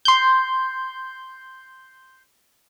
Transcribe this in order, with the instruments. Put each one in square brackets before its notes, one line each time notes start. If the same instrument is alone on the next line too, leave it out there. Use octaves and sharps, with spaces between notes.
[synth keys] C6 G6